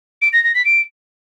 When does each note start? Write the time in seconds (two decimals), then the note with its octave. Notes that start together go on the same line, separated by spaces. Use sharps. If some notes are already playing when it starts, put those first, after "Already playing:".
0.21 D7
0.32 A#6
0.43 A#6
0.54 B6
0.65 D7